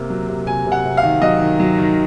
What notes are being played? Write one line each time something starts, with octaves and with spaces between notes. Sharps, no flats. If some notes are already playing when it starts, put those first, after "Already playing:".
Already playing: C3 A#3
F#3
C3
C3 G#5
C3
F#5
C3
F5
D#3
F#3 D#5
D#3
F#3
D#3